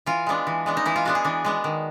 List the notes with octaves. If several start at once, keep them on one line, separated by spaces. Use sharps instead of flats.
E3 F4
G#3 B3 D4
E3
G#3 B3 D4
D#4
E3 E4
F4
G#3 B3 D4 F#4
G#4
E3 D4
G#3 B3 D4
D#3